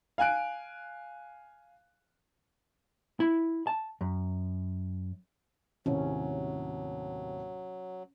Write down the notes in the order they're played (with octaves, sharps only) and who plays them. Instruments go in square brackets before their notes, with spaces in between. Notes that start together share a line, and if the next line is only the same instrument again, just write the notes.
[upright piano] F5 G#5 F#6 D7
[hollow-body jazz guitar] E4
A5
F#2
[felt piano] D#2 A2 C3 [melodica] F#3 [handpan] C#4